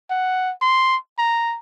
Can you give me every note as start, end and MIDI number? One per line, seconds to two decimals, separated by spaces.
0.10 0.52 78
0.62 0.96 84
1.19 1.58 82